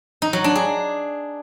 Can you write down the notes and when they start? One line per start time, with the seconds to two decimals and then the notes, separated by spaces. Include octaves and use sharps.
0.22 D#4
0.33 F#3
0.44 D4
0.56 G#4